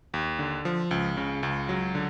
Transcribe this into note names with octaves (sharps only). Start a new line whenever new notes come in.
D#2
D3
F3
C#2
C#3
C#2
F#3
D3